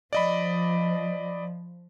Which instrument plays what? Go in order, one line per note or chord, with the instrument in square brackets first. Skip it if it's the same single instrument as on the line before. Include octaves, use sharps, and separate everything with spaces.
[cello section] F3 [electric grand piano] D5 D#5 B5